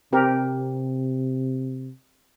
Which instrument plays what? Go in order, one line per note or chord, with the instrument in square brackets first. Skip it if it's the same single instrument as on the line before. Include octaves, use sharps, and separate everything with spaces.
[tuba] C3 [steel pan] C4 G4 A#4